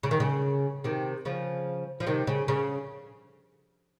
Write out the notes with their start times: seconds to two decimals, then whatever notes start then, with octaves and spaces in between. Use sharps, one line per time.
0.03 C#3
0.11 D#3
0.20 C#3
0.84 C3 D#3
1.25 C#3 F3
2.00 F3
2.07 C3 D#3
2.27 C#3
2.48 C#3